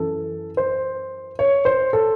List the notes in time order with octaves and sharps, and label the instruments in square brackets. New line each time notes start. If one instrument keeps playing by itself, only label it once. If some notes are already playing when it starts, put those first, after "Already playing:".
Already playing: [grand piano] F#2 E3 A4
C5
C#5
C5
A4